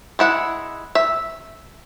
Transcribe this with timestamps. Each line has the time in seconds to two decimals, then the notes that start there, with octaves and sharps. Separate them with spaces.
0.19 G#3 E4 F#5
0.95 E5